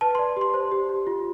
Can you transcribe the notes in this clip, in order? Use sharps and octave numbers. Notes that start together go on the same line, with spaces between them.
B4 A5
D5 C6
G4 C6
C5
G4
G4
F4